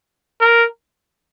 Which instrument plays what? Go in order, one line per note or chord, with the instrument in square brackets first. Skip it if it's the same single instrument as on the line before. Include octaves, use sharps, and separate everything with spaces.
[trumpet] A#4